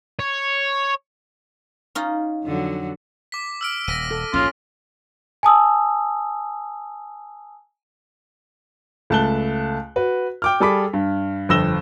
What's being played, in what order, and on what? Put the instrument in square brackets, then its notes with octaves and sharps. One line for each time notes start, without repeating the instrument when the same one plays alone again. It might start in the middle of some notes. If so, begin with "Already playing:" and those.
[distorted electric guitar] C#5
[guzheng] C#4 D#4 F4
[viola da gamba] F2 D3 F#3
[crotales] D6 B6
E6 F6 D7
[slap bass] D#1 [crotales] A#6 B6 D#7
[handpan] A4
[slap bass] A#1 D#2 G#2 [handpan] C#4 [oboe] F4
[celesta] G#5 A5 D#6 E6
[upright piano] C#2 A3 A5 F#6 G7
F#4 B4
G5 D6 F6
G3 G#4 A4 B5 D6 B6
G2
G1 F2 E6 A#6 E7 G7